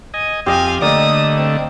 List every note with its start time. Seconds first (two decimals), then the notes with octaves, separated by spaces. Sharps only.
0.14 D#5 G#5
0.46 F2 C4 G4 D#5 F5 G#5
0.82 D3 A3 A#3 D5 D#5 D#6
1.37 C4